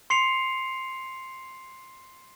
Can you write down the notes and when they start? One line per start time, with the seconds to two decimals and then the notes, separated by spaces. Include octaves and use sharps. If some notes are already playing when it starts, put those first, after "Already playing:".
0.10 C6 C7 C#7 F7